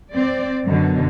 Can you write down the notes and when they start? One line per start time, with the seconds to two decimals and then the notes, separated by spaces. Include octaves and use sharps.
0.14 C4 D5
0.64 F#2 B2 D3